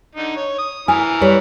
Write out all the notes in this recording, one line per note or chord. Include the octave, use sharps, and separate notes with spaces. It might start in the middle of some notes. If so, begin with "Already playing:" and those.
D3 D#4
C#5
D#6
E3 G#5 A#5 F6
G3 B4 C#5